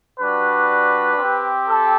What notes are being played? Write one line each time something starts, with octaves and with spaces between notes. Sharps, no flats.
G3 D4 F#4 B4
C4 G4
A4